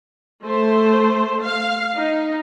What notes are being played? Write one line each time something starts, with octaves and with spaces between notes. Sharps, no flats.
A3 C5
F5
D#4